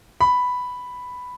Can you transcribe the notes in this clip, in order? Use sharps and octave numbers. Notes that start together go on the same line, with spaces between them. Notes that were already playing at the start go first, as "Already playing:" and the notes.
B5